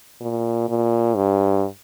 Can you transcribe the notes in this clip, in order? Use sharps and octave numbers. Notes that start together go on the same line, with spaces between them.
A#2
A#2
G2